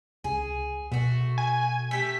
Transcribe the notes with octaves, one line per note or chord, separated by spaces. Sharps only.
C#2 G#4
B2 A3 F#4
G#5
A3 G4 A4 B6